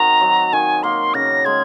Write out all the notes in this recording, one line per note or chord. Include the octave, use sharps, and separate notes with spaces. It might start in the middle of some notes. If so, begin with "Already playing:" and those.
Already playing: D#3 C4 F#4 A#5
F#3
D#3 G#5
A#3 C6
C#3 A#6
G#3 G#6